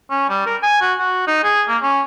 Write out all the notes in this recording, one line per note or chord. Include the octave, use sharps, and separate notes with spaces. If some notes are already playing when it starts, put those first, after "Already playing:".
C#4
G3
A#4
G#5
F#4
F#4
D#4
G#4
A#3
C#4